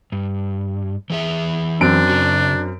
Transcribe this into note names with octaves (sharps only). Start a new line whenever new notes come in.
G2
E3 G#4 E5
F#2 C4 D4 D7
C#3 F#4